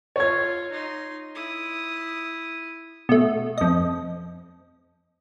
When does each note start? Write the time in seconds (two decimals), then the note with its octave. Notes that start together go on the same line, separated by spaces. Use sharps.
0.16 F4 C#5 G#6
0.71 D#4 C6
1.35 E4 D#6
3.09 B2 A3
3.58 F2 D#5